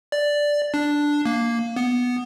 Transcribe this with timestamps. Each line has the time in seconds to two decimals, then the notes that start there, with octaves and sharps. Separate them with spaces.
0.12 D5
0.74 D4
1.26 A#3
1.76 B3